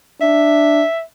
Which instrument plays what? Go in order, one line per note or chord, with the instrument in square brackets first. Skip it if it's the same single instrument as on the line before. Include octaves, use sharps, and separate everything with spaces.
[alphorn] D4 [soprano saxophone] E5